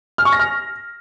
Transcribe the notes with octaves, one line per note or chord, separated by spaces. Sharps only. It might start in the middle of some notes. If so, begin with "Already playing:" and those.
F6
C#6
A#6
F6